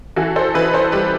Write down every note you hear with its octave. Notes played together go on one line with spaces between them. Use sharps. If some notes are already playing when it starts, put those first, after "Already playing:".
E3 F#4 A4
A4 C5
E3 B4 D#5
A4 C5
G3 G4 B4